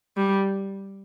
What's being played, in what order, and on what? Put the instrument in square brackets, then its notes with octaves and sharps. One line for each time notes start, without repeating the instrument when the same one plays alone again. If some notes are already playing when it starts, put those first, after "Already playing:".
[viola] G3